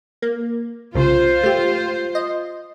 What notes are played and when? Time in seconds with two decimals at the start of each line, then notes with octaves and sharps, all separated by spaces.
0.22 A#3
0.95 C2 C#3 F4 C5
1.43 A3 G4
2.15 D#5